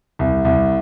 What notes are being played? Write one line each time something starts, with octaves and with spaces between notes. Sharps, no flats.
C2
C2